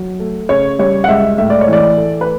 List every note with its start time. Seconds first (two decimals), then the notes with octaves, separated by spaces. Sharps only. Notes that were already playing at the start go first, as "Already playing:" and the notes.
Already playing: F#3
0.20 A3
0.49 C#3 C#5
0.79 G3 C#5
1.04 F#5
1.08 C#2 E5
1.38 A2 E5
1.50 D5
1.61 C#5
1.68 E3
1.73 D5
1.98 A3
2.21 B4